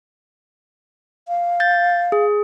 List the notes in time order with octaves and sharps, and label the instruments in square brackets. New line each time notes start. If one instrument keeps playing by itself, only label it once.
[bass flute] F5
[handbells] G6 A6
G#4